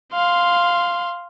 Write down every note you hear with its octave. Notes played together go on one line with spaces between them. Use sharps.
F5 C6